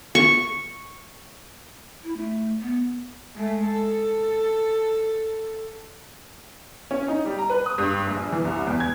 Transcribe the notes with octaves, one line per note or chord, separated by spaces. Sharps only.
C#6
E4
A3
B3
G#3 A3
A4
C#4
D#4
G3
A#5
B4
D#6
G2
A#1
E3
C2
E2
G#6